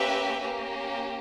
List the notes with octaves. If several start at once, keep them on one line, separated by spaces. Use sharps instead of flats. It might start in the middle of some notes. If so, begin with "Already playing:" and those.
Already playing: A#3 C#4 G4 B4 E5
A#3 C#4 G4